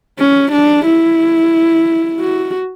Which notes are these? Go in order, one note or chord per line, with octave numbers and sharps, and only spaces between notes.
C#4
D4
E4
F#4